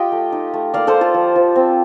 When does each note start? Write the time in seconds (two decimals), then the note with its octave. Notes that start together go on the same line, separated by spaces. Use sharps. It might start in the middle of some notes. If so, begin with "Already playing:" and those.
Already playing: F4 G4 D#5 G5
0.12 A3
0.32 D#4
0.53 A3
0.74 A#3 D5 F5
0.87 A4 C5
0.94 A#3
1.01 F4 A4
1.14 F3
1.36 F3
1.56 C4